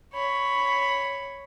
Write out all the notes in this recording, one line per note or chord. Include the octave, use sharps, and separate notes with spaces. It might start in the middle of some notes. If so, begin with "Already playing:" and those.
C#5 B5